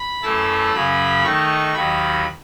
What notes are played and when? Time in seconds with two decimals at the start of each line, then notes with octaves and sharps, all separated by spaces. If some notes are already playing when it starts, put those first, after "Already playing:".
Already playing: B5
0.22 F#2 E3 A3 E4 A5
0.73 F#2 C#3 F#3 C#4 B5
1.24 D#3 A3 D#4 C#6
1.74 D#2 D#3 F#3 B5